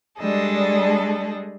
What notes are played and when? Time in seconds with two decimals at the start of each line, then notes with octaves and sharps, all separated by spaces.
0.18 G3 G#3 D4 G#4 A4 D#5